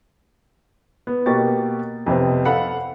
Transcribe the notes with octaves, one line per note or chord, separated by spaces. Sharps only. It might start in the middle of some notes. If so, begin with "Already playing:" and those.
B3
B2 A#3 G4 C#6 A6
F2 C3 B3 C4
A4 F5 F#5 B5